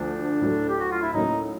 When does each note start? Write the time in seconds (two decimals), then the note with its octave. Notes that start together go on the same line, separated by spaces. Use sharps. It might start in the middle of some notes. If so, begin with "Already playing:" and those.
Already playing: D2 D3 F3 D4
0.40 A2 F#3 A3
0.68 G4
0.80 F#4
0.91 F4
1.02 E4
1.14 A2 F#3 A#3 C#4 D#4